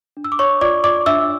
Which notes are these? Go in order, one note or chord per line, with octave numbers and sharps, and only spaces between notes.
D4
E6
D6
C#5 C#6
F4 D5 D6
D5 D6
D4 E5 E6